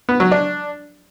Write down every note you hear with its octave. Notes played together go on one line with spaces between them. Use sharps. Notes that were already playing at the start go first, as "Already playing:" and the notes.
B3
F#3
D4